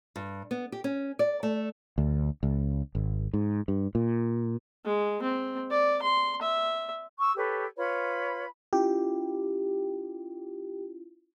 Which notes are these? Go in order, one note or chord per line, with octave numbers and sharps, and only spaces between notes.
G2
B3
G4
C#4
D5
A3
D2
C#2
G#1
G#2
G2
A#2
G#3
C4
D5
C6
E5
C#6 E6
G4 A4 B4 C#5
F4 B4 C#5 B5
C#4 E4 F4 G4